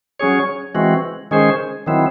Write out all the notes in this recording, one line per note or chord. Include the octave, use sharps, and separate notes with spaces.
F#3 C#4 G#4 C#5
E3 G#3 C4 F#4
D#3 G#3 C#4 G#4 C5
D#3 F#3 C4 E4